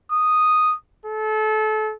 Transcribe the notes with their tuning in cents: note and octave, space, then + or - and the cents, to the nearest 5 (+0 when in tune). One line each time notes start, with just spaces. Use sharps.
D#6 -5
A4 -30